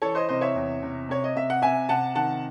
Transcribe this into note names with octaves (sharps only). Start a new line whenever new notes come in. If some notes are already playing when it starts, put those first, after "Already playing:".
E3 A4 C#5
C5 D#5
C3 C5 D#5
C#5 E5
E2
C3
C3 C#5
D#5
C3 E5
F#5
C3 E5 G#5
C3 F#5 A5
D#3 F#5 A5